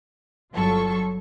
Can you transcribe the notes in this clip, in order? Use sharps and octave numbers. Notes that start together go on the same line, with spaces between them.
G1 G2 F#3 F4 A4 C#6